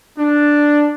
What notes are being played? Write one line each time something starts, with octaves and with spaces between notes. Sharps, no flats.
D4